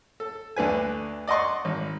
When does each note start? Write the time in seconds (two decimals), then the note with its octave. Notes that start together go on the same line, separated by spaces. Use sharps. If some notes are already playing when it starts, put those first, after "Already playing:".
0.20 A4
0.56 D2 D3 B4 G#5
1.28 D5 D#5 F#5 C6 C#6
1.65 G#1